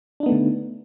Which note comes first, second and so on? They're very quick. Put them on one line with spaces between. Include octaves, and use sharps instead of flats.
D4 D#4 B3 A3 D3